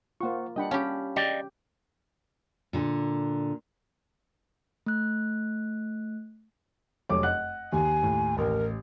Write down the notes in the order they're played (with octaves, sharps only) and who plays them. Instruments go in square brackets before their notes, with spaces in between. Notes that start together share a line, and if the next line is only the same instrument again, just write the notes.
[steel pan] A#3 F4 [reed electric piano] C5 F#5 C#6
[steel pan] G3 D4 F#5 [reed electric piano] D#5 G5 B5
[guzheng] C#4 G4 [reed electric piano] F5 A5 B5
[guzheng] G4 [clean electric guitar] D5 D#5 G5
[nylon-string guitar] A#2 D3
[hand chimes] A3 F#6
[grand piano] F1 F#2 C#5 [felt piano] D6
[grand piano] D#5 F#5 [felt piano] F#6
[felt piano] D#2 [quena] G#5
[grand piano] A2
[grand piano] A1 [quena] A#4